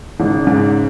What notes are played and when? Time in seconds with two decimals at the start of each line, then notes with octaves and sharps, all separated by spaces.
0.20 G#1 C#3
0.47 G#2